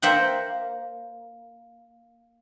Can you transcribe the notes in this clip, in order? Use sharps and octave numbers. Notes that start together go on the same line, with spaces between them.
A#3 C5 E5 F#5 G5